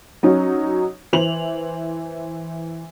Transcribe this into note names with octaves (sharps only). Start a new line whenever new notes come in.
F#3 C#4 D#4
E3 C5 F7 F#7